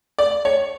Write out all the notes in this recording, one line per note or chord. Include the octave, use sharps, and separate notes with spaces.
D5
C#5